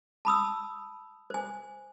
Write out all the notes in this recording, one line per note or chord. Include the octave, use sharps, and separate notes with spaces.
A5 B5 D#6 E6
C5 G#5